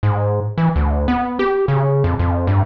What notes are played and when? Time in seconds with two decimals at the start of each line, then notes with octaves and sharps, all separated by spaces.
0.03 G#2
0.58 E3
0.76 D2
1.08 B3
1.39 G4
1.68 C#3
2.04 F2
2.19 F2
2.47 G2